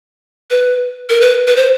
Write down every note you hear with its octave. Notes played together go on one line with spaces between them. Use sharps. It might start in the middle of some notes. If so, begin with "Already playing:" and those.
B4
A#4
B4
B4
C5